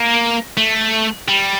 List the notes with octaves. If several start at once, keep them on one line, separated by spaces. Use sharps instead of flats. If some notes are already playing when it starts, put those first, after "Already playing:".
Already playing: A#3
A3
G3